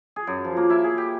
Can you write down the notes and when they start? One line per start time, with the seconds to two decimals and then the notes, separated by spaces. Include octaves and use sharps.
0.16 G#4
0.27 F#2
0.45 F3
0.57 A#3
0.70 E4
0.84 G#4
0.98 G4